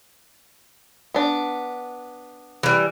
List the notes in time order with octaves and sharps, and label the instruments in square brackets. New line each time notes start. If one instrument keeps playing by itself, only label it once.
[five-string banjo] B3 D4
[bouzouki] E3 G3